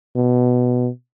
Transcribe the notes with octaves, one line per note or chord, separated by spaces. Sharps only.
B2